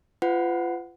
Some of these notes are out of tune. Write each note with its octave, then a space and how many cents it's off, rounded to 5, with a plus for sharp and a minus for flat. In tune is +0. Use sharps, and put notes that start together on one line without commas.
F4 -20 B4 +40 F#5 +0